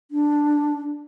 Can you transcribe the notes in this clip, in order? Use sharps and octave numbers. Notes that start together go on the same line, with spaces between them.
D4